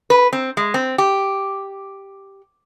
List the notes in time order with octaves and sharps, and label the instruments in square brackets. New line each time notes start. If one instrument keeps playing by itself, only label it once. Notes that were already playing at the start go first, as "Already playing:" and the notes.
[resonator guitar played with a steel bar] B4
C4
G#3
C4
G4